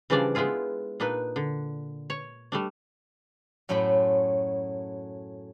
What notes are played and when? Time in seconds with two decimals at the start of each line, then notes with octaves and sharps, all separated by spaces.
0.10 C#3 E3 F3 G3 D4 D5
0.35 G#3 B3 E4 F4 G#4
1.00 A#2 D4 D#4 B4
1.36 D3
2.10 C#5
2.52 G3 A3 D4
3.69 F#2 A2 F#3 A3 C5 B5